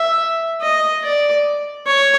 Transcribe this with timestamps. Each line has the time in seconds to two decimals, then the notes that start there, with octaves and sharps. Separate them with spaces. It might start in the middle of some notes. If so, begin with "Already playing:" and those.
Already playing: E5
0.62 D#5
1.03 D5
1.87 C#5